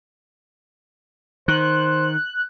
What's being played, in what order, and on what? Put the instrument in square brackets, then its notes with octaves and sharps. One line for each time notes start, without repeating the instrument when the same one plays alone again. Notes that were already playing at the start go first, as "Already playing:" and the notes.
[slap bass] D#3 [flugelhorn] C5 [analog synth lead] F#6